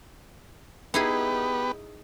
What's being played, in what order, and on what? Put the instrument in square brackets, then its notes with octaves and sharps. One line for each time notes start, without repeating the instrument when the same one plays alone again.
[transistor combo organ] B3 G4 B4 [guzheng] D#4 E4 G#4